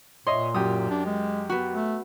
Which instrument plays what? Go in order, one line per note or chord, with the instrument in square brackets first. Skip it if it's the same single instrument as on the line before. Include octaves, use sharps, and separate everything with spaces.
[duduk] A#2 [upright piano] C#5 D#5 E5 [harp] C6
[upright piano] F#2 G4 [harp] D#6
[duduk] D4
G#3
[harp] B3 F#4
[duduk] A3